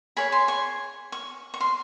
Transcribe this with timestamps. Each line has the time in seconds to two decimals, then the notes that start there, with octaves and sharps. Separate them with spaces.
0.17 G#4 C#5 B5
0.32 C6
0.48 C#6
1.12 C#6
1.54 C#6
1.61 C6